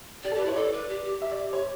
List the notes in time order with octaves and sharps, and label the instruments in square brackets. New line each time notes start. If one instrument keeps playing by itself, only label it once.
[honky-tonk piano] G4 [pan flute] D5
[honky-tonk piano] A4
[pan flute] G4
[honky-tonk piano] B4
[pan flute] E4 [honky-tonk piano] C#5
[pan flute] A4 [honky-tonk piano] D5
[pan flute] B4
G4
G4
[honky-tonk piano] E5
D5
C#5